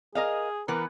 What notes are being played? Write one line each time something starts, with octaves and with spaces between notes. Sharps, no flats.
G#4 A#4 D#5 F5
E3 B3 A#4 B4